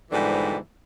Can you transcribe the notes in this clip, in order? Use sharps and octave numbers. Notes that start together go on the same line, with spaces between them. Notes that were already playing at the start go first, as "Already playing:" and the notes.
G#2 B2 D3 E3 F3 G3